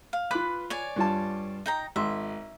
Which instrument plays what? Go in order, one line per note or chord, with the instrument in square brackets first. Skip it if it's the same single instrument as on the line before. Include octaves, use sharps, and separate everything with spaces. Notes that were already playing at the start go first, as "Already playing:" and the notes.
[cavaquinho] F5
[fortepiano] F4 F#6 [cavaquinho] B4 B5 D6
[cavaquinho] C#5 D5 G#5
[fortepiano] G2 F4 A5
[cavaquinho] D#4 G5 A#5
[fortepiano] G#1 C6 [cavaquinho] E5